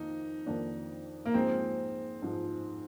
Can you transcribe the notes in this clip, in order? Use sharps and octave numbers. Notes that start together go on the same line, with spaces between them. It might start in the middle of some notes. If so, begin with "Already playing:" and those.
Already playing: F2 D#3 A#3 D#4
F2 D#3 A#3 D4
A#3
G#2 F3 G#3 C4
G#2 F3 G#3